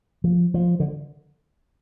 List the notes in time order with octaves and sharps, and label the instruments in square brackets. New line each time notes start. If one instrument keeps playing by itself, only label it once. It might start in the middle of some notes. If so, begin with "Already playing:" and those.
[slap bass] F3
F3
D3